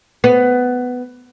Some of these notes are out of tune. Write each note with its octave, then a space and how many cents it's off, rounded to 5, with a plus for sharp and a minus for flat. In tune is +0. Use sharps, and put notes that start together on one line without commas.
B3 +10